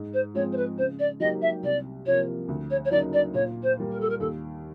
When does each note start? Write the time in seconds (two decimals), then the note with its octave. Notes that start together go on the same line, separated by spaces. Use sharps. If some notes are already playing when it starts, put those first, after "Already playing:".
Already playing: G#2
0.13 C5
0.34 F3 G#3 C4 C#5
0.52 C5
0.56 B4
0.77 C#3 C5
0.99 D5
1.20 F#3 A#3 D#4 G4 D#5
1.41 E5
1.63 C2 D5
2.05 C3 F3 A#3 C#5
2.48 D2
2.70 C#5
2.84 C#5
2.91 C#3 F#3 A#3 D#4 D5
3.13 D5
3.34 A#2 C#5
3.62 C5
3.77 G3 A#3
3.91 A#4
4.00 A4
4.09 A#4
4.20 D#2 A4